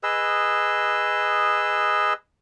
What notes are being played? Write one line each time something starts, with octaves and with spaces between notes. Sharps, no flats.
G#4 B4 D#5 E6